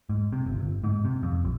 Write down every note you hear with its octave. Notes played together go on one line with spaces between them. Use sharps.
G#2
C3
G1
G1
G#2
C3
F2
A#1